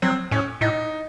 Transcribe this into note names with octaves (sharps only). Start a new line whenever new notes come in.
F#3 C4
A2 C#4
A2 D#4